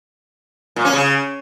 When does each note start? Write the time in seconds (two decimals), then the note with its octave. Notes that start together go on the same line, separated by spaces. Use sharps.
0.76 A#2
0.85 C#4
0.93 C#3